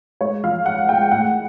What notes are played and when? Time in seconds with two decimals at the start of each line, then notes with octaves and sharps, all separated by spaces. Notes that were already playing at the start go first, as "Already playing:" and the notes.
0.21 G#3 C#5
0.43 F3 F5
0.66 G#3 F#5
0.88 G#3 G5
1.11 A2 F#5